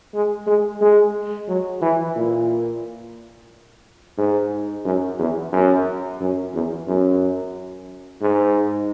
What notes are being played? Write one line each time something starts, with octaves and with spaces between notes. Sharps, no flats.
G#3
G#3
G#3
F#3
E3
A#2
G#2
F#2
E2
F#2
F#2
E2
F#2
G#2